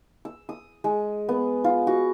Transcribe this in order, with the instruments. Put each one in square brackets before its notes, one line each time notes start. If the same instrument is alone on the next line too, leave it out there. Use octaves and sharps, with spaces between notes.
[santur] E6
D#6
G#3
B3
F4
F#4